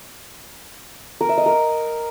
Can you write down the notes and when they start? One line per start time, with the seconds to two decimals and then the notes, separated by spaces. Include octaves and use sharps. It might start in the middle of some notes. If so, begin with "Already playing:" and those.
1.21 A#4
1.29 E5
1.38 D#5
1.46 A#4